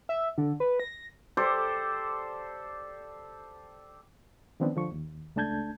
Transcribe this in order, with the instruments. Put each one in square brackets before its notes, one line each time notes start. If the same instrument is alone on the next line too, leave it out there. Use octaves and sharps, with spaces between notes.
[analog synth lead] E5
D3
B4
A#6
[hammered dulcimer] G4 A4 C5 D5
[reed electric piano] D#3 F3 B3 C4 D4
D3 F3 C#6
D#2
C#2 A3 D4 A5 G6 G#6